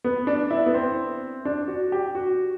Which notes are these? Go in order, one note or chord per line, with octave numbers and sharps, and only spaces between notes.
B3
D4
E4
B3
C4
D4
F#4
G4
F#4